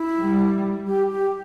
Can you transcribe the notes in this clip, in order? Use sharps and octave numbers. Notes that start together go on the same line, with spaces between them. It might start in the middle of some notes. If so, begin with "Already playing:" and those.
Already playing: E4
G3
G4
G4